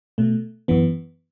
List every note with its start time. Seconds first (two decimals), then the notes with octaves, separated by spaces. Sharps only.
0.18 B2 A3
0.68 F#2 E3 B3